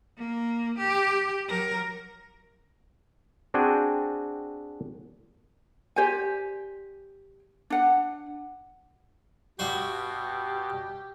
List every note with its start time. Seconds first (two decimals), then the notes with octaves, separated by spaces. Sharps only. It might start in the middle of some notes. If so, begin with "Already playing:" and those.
0.17 A#3
0.78 G4
1.47 F#3 A#4
3.54 C4 D4 F#4 G#4 G5 G#5
5.96 G4 C5 D5 G#5
7.70 D4 F#5
9.59 G2 B2 F#4 G4 C6